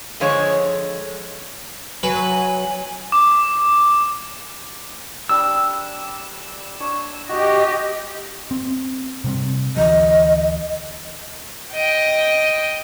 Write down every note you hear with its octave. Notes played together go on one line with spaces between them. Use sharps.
D3 F3 G#3 C5 C#5
F#3 B4 G#5
D6
G3 D4 B5 E6
D4 C#5
F#4 G4 D#5
C4
C3 G3 C4
D2 E3 F#3 D#5
D#5 G5